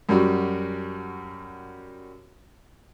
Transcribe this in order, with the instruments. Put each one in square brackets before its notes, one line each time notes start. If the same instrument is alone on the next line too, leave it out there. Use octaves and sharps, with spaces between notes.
[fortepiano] F#2 G3 F#4